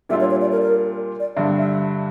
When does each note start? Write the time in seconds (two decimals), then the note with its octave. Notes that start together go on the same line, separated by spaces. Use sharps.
0.09 A#2 G3 D4 F4 E5
0.20 C#5
0.31 C#5
0.41 D5
0.52 A#4
0.62 A#4
1.20 D5
1.36 G2 D3 G3 D4 E5
1.47 F5
1.57 E5